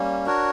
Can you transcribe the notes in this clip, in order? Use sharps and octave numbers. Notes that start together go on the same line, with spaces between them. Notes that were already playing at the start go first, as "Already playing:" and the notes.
Already playing: G3 A#3 C#4
D4 F#4 A#4 C#5